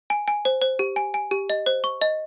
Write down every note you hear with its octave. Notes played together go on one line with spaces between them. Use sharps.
G#5
G#5
C5
C5
G4
G#5
G#5
G4
D#5
C5
C#6
D#5